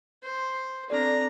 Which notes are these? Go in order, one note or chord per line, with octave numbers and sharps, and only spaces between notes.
C5
C4 D4 A4 D5 A#5